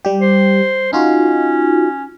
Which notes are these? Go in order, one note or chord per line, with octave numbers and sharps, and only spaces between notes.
G3 G4
C5
C#4 D#4 F4 F#4